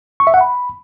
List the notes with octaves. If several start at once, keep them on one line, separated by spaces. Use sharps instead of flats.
C#6
E5
F#5
B5